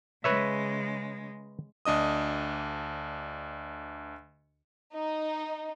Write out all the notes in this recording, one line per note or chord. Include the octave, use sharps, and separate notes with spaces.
C#3 G#3 B4 C#5 E5
D2 D4 D#5 D#6
D#4